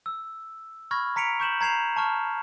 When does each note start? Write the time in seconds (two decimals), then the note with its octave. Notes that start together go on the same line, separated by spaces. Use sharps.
0.06 E6
0.91 B5 C#6 F6 G#6 A#6
1.16 A#5 B6 C#7 D7 F7
1.40 C#6 G6 E7 F#7
1.61 A#5 G#6 C7 E7 F7
1.96 A5 C#6 F6